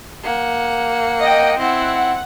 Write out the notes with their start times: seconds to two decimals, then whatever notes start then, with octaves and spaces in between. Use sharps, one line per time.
0.24 A#3 F#5
1.21 D#5 G5
1.58 C4 E4 F#5